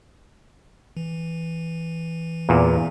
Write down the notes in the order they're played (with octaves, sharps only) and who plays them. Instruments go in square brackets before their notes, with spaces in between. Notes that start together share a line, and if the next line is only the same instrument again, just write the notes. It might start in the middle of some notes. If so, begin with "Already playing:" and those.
[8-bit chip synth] E3
[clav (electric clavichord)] E2 A#2